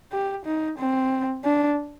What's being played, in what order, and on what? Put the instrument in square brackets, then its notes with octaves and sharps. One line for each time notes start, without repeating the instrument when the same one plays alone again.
[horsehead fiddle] G4
D#4
C4
D4